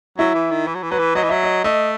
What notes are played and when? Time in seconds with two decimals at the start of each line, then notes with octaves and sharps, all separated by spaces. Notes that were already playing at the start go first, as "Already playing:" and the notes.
0.18 F#3 E4
0.35 E3
0.51 D#3
0.67 E3
0.75 F#3
0.83 E3
0.91 F#3 B4
0.99 E3
1.15 F#3 D#5
1.23 E3
1.29 F#3 E5
1.43 D#5
1.64 A3 D#5